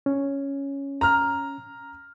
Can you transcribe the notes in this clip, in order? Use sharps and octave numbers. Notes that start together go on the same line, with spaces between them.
C#4
A#5 F6